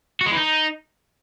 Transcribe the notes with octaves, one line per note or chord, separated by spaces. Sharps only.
F#4
G#3
E3
D#4